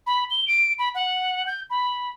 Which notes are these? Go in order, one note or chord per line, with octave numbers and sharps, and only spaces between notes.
B5
G7
D7
B5
F#5
G6
B5